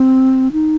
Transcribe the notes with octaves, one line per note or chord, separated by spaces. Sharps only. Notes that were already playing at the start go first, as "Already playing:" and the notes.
Already playing: C4
D#4